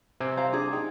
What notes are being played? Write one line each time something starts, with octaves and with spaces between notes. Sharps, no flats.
C3 C4 G#5
C5 F5 A#5
D4 G#4
D#4 G5